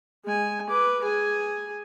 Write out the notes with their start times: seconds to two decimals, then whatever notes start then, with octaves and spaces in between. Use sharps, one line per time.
0.25 G#3 G#5
0.70 B4 D6
1.03 G#4 G#5